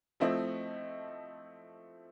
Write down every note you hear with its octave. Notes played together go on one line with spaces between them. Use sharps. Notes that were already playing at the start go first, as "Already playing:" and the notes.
F3 A3 C4 E4 D#5